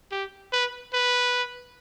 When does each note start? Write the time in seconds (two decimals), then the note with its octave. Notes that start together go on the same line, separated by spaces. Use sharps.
0.12 G4
0.53 B4
0.94 B4